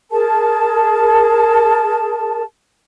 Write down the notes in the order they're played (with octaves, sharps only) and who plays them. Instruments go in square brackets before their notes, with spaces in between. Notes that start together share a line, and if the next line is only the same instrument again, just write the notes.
[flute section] G#4 A#4 A5